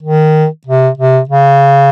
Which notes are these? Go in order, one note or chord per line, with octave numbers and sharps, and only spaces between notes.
D#3
C3
C3
C#3